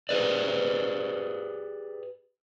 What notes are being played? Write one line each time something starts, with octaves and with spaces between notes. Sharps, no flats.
G4 G#4 B4 D5